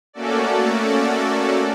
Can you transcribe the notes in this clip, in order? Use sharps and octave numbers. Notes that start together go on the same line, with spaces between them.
A3 A#3 C#4 F#4 A4 D5